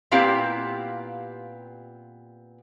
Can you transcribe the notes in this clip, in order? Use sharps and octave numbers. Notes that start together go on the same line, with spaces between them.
A#2 B3 C4 E4 G4 F5